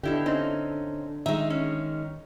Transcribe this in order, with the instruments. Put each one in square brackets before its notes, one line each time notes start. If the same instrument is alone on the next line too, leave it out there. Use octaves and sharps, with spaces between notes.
[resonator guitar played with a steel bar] B2 E4 G4 [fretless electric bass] D3
[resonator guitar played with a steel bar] C4 C#4 D#4
[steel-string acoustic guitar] D#3 G#3 [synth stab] E5
[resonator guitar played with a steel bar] C#4